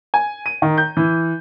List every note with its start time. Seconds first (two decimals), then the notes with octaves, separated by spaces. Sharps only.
0.14 G#5
0.46 D#7
0.62 D#3
0.78 G6
0.97 E3